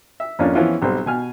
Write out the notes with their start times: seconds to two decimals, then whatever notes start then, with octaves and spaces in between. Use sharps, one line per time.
0.20 E5
0.39 F2 A#3 C#4 D4 F4
0.55 E3 F3 B3 C#4 E4 F4
0.82 B1 G3 C4
1.06 B2 G#5 F6